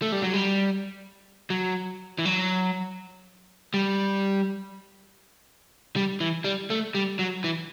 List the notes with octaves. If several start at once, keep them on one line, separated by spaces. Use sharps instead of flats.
A3
G3
F#3
G3
F#3
E3
F#3
G3
G3
E3
G3
A3
G3
F#3
E3